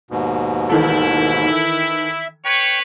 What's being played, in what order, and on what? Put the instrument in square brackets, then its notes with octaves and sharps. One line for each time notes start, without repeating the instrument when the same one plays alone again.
[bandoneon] D#2 G#2 B2
[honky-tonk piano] D#3 E3 A4 [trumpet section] E4
[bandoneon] E5
[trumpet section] B4 C#5 [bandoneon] G5